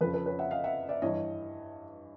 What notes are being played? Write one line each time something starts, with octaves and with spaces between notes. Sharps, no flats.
F2 C#3 F3 A4 B4
A4 B4
B4 C#5
E5 F#5
D#5 F5
E5 F#5
D5 E5
G2 E3 C#5 D#5